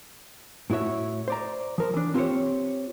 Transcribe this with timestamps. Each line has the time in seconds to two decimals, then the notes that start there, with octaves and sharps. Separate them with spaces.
0.70 A2 E4 F#4 C#5 E5
1.28 C5 D5 A#5
1.78 F3 A#4 C5
1.94 E3 D4
2.14 C4 F4 G4 A4 C5 C#5